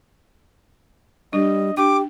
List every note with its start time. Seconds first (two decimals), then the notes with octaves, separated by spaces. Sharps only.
1.33 G3 D4 D#5
1.77 D4 G4 G5 D6